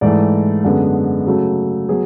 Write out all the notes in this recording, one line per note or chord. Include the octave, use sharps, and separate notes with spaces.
G#2 E3 A3 D5
F#2 D3 G#3 B3
C#3 F#3 A3
F#3 B3 G#4